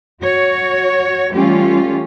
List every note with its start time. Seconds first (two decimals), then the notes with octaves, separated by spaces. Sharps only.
0.23 F#4 C#5
1.33 E3 G3 A3 C#4 F4 G4